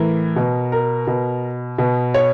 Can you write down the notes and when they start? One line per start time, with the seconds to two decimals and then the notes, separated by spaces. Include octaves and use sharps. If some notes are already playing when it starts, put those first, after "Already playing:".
Already playing: A2 E3 A#4
0.36 B2
0.72 A#4
1.07 B2
1.78 B2
2.14 C#5